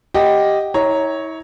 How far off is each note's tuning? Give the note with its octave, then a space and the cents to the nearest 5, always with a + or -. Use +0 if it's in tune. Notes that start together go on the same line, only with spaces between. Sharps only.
G4 +0 D#5 +0 F#5 +0
E4 -40 C#5 +0 A#5 +0